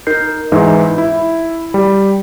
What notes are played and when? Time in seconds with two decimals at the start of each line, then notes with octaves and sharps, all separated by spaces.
0.07 D#4 A#4 G6 C7
0.52 G#2 E3 D#4 E4
0.98 E4
1.74 G3